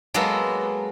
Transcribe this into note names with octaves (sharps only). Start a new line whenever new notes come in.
F#3 G#3 A#3 B3 A4